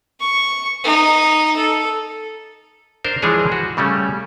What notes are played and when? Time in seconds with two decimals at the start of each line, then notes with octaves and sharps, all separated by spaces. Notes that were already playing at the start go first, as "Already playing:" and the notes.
0.20 C#6
0.84 D#4
1.56 A4
3.04 D4 A#4 C5
3.22 E3 F3 G#3 D4 G#4 C#5
3.52 F#4
3.77 C#3 G3 A3 C#4